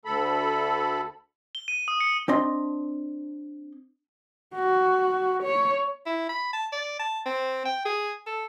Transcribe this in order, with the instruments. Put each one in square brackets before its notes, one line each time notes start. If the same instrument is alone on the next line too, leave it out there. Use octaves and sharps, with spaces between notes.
[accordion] D2 A4 B5
[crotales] G7
D#7
D#6
C#7
[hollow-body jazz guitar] C4 D4 D#5 C6
[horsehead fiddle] F#4
C#5
[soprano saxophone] E4
B5
A5
D5
A5
C4
G5
G#4
A4